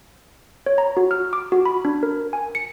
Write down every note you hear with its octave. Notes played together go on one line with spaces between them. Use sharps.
C#5
A#5
F#4
F6
D6
F#4
B5
D4
A#4
G#5
C#7